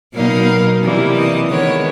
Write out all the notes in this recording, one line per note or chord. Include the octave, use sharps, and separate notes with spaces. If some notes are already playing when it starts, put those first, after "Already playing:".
B2 F#3 A#3 D#4 F5
C3 E3 G3 A#3
D#5
D#3 G#3 B3 C#5